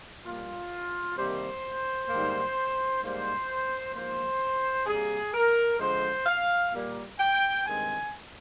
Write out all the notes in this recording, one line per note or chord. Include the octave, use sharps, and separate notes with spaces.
A#2 G3 A#3 F4
C3 D#3 G3 A#3 C5
G#2 D#3 G3 A#3
G#2 G3 A#3 C5
G#2 F3 A#3 C5
C3 G3 A#3 G#4
A#4
D3 F3 G#3 C5
F5
A#2 G3 A#3
G5
G2 D#3 G#3 C4 G#5